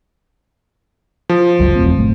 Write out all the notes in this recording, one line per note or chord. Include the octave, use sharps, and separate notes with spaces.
F3
G1 C#2 F#3
E1 A3 C4
G#1 A3